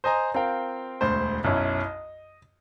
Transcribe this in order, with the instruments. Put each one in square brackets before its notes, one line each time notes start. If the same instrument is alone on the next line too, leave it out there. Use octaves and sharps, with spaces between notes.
[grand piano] C5 D#5 G#5 A#5
C4 F4 A#4 F5 G5
E1 D2 C5
B1 F#2 C#4 E4
D#5